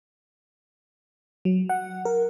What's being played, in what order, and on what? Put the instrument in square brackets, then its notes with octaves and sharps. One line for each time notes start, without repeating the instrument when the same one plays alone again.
[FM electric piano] F#3
F#5
A#4